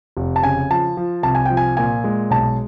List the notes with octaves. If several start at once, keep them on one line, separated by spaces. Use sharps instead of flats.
F1
A5
C#3 G#5
F3 A5
F3
C2 A5
G#5
F3 G5
G#5
A#2 G#5
G#3
B1 A5